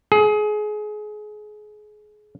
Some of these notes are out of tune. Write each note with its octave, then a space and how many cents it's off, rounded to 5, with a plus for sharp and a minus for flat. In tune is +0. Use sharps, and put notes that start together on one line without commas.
G#4 +25